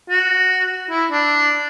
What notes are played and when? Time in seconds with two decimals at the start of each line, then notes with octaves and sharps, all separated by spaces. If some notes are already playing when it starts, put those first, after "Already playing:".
0.10 F#4
0.90 E4
1.11 D4